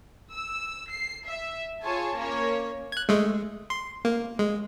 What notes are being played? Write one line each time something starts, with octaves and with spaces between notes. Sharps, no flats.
E6
C7
E5
F4 G#4 C#5 G#5 A5
A#3 C#4 A#4 C#5
F#6 G#6
G#3 A3
C6
A#3
G#3